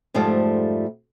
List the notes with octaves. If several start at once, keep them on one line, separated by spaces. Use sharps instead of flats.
F2 G#2 F3 G3 A3